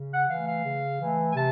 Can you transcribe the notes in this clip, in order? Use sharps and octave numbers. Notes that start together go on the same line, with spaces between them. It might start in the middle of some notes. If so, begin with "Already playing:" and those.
Already playing: C#3
F#5
E3 A3 F5
F5
C#3
E3 A3
G#5
C3 A5